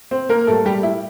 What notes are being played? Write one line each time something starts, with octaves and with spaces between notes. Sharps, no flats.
C4 C5
A#3 A#4
A2 G3 A3 A#3 A4
G3 G4
E4